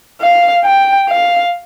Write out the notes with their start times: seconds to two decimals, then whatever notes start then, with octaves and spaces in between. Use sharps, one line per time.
0.21 F5
0.64 G5
1.09 F5